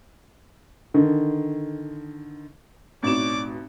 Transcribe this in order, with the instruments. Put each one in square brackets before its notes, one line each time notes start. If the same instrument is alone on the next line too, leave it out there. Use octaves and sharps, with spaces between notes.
[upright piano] D3 D#3
[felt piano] A1 B2 E7 [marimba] C4 D#4 [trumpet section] C#5 D5 D6